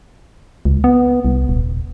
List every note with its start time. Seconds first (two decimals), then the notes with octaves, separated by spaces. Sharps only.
0.65 C#2
0.84 B3
1.25 C2
1.49 D#1